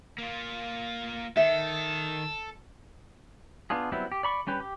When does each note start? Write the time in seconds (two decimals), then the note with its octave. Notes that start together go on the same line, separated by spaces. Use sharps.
0.18 A#3 F4
1.37 D#3 A4 E5
3.70 B3 D4 F4 G#4
3.92 F#3 G3 B3 C4 E4
4.12 G4
4.23 D5 B5 C#6
4.47 G3 C#4 G4 B4
4.60 G4